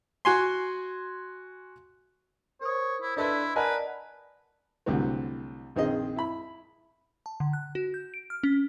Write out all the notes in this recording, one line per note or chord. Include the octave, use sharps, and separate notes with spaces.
F#4 G#5 C6
A#4 C5 C#5 D#6
E4
D4 E4 A4 B4 D#5 E5 C6
A#4 B4 D5 D#5 F#5 G#5 A5
C2 A2 D3 F#3 C4
A#1 D#3 C4 G#4 D#5
E4 B5
A5
D3
F#6
F#4
G6
D7
F6
C#4